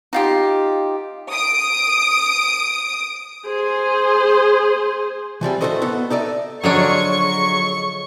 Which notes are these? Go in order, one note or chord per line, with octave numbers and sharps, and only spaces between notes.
D#4 F4 G4
D#6 D7
G#4 C5
E3 F3 G3 C4
A2 A#3 F#4 A4 C5 D#5
B3 A4
D#4 A4 D5 E5
D3 F3 F#3 D4 G#4 C#5 D#5 C#6